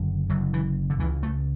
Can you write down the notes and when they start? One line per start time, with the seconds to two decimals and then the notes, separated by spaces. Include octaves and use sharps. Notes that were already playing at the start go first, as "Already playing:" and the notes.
Already playing: F#1 F#2 D3
0.29 F#1 F#2 D3 F#3
0.54 E3
0.90 D3
0.99 C#2 C#3 E3
1.23 A3